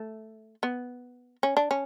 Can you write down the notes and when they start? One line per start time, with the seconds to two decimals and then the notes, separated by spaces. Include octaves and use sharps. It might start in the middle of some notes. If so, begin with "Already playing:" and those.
Already playing: A3
0.63 B3
1.43 C#4
1.57 D4
1.71 C#4